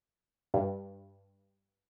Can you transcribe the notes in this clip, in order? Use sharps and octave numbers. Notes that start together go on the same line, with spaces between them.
G2